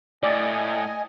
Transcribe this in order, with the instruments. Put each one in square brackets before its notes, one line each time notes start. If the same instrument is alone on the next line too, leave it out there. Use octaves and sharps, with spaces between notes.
[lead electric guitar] A2 [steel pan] D5 [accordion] D#5 G#5